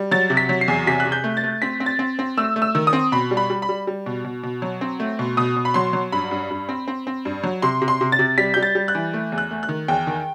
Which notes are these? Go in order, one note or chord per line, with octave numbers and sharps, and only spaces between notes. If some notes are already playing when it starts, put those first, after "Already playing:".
Already playing: G3
F#3 A6
C3
B6
F#3
C7
E2
C3 B6
F#6
C3
G6
A3
A6
A3
C4 B6
C4
A6
C4
C4
A3 E6
A3
E6
D#3
D#6
C4
B2 B5
G3
B5
G3
B5
G3
G3
B2
B2
B2
F#3
C4
A3
B2
B2 D#6
B2
B5
F#3 C6
F#3
G2 B5
G2
G2
C4
C4
C4
G2
F#3
C3 C6
C3
C6
C3
A6
C3
G3 B6
G3 G6
A6
G3
F#6
E3
A3
E2
F#6
A3
F#6
D#3
E2 G5
D#3